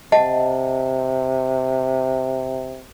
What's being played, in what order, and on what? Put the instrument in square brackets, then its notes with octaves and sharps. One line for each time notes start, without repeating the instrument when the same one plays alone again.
[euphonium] C3 [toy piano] D#5 F#5 A5